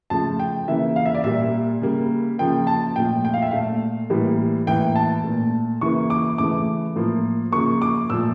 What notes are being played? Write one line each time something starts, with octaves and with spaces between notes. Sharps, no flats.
C#3 F3 A3 A5
G5
C#3 E3 A#3 E5
F5
E5
D5
A#2 G3 A#3 E5
C#3 G3 A#3
C#3 F3 A#3 G5
A5
A#2 F3 A3 G5
G5
F5
E5
A#2 A3 F5
A2 E3 G3 A#3
A2 E3 A#3 G5
A5
A#2 A3
C#3 E3 A#3 C#6
D6
C#3 E3 A3 D6
A2 F3 A#3
C#3 F3 A#3 C#6
D6
A#2 F3 A3 E6